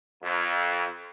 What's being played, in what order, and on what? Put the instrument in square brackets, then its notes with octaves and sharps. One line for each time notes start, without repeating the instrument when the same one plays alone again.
[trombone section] F2